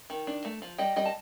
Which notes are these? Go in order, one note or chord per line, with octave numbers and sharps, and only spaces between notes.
D#3
D4
A3
F3
G3 D#5 G5
G3 D#5 G5
A5